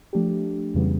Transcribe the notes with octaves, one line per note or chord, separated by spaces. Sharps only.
F3 A3 D4 G4
F2 C#3 E3 G3 B3